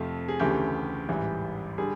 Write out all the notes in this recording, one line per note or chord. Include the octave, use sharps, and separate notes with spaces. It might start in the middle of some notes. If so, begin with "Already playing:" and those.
Already playing: F2 C3 F3 A3
G#4
D2 C#3 E3 A3 G4
A1 G#2 E3 G3
D3 G3 G#4